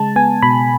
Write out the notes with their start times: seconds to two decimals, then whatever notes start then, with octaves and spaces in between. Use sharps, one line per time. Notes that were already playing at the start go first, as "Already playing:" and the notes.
Already playing: C#3 G#3 A5
0.16 B3 G#5
0.42 B2 B5